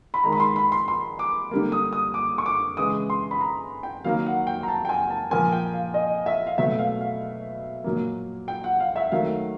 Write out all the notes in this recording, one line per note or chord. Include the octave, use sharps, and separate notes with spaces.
B5
D#3 G#3 A#5
B5
C6
B5
C6
C6
D6
D3 G3 A#3
D#6
D#6
D6
C#6
D6
C#3 E3 G#3 D#6
C6
B5
A#5
G5
D#3 F#3 A#3 F5
F#5
G5
A#5
A5
G5
G#5
A5
A#2 F3 A#3 G#5
G5
F5
D#5
E5
F5
B2 F#3 A3 E5
F5
F5
A#2 F#3 A#3
G5
F#5
F5
E5
D#3 F#3 A3 F5